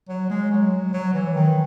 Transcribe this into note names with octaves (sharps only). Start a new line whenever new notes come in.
F#3
G#3
F#3
F#3
E3
D#3